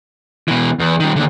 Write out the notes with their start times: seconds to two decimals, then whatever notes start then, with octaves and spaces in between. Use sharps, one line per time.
0.48 B2 E3
0.79 E2
1.00 D#3 G3
1.16 D#2 D3